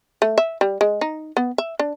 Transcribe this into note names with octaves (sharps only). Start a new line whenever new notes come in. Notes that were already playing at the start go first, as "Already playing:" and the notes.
A3
E5
G3
G#3
D#4
B3
E5
D4